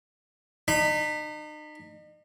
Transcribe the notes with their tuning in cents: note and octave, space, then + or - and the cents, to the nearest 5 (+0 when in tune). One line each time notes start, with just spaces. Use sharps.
D#4 -40 B5 +0